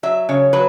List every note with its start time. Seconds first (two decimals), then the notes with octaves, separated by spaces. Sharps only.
0.03 F#3 E5
0.29 C#3 C#5
0.53 F#3 B4